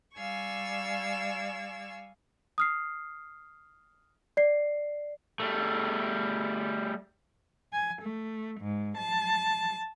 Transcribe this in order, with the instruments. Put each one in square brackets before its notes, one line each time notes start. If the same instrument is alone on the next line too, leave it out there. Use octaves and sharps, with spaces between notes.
[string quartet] G3 D5 F5 G#5 C#6 E6
[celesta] D#6 F6 C7
D5 C7
[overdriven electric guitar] G3 A3
[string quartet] G#5
A3
G#2
A5